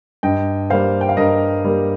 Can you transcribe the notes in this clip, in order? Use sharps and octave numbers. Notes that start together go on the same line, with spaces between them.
G2 D#5 G5
G3 A#3 C5 F5
G5
F5
G2 A#4 D#5
G3 A#3